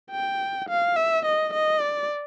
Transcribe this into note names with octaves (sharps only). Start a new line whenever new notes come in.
G5
F5
E5
D#5
D#5
D5